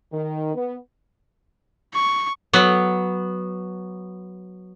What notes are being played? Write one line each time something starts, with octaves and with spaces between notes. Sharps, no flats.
D#3
B3
C#6
F#3 B3